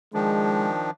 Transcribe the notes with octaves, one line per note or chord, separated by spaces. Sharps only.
D#3 F3 G#3 D4